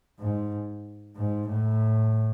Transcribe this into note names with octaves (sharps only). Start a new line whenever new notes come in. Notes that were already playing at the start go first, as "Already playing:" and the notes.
G#2
G#2
A2